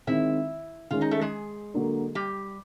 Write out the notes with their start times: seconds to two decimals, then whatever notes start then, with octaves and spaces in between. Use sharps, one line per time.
0.07 D#3 G#3 C4 E4 E5
0.91 D#3 G#3 C#4 F4 F5
1.01 D#4 D#5
1.11 A3 A4
1.21 G#3 G#4
1.74 D3 F#3 A#3 D4
2.15 G3 G4